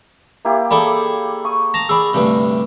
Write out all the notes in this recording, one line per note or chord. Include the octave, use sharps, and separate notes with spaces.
A#3 E4 G4
G#4 A4 D5 B5
C#6 D#6
A5 A#5 A#6
G#4 D5 B5 E6
D2 G2 C3